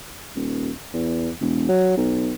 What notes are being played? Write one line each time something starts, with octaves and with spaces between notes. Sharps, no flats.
D#1
E2
E1
F#3
B1